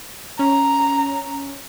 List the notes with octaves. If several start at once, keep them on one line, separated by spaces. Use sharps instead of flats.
C#4 A#5